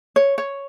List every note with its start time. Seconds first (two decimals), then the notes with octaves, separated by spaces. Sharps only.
0.16 C#5
0.38 C#5